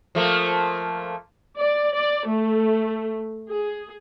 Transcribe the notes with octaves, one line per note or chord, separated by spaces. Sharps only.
F3 A3 A#3
D5
D5
A3
G#4